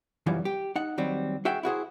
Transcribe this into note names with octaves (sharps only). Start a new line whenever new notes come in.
C2 F#2 E3 F3 G3
G4
D#4 F#5
D#2 F#3 G3 C4
F#4 G#4 E5 G5
E4 F#4 G#4 C5